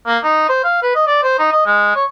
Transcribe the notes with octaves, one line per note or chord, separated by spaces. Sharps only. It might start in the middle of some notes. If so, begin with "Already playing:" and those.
A#3
D#4
C5
F5
B4
D#5
D5
C5
D#4
D#5
G#3
C#5